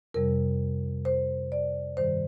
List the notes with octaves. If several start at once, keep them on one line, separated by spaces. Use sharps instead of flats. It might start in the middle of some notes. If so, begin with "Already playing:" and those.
F2 C3 G3 A#4
C5
D5
G2 D#3 G3 C5